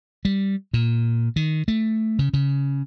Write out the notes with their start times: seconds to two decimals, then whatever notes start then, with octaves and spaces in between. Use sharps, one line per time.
0.25 G3
0.74 A#2
1.36 D#3
1.68 A3
2.19 C#3
2.34 C#3